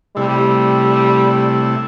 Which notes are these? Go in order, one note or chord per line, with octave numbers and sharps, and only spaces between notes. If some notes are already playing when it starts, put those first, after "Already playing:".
C3 G3 A3 E4